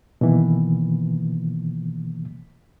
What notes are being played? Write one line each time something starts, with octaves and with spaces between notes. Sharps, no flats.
B2 D#3 E3 A#3